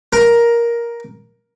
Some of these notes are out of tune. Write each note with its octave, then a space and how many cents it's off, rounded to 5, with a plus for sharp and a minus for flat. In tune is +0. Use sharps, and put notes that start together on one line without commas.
A#4 +10